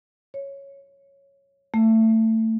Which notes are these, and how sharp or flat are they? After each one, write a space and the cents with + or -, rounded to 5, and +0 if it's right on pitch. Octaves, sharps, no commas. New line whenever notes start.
C#5 -5
A3 +25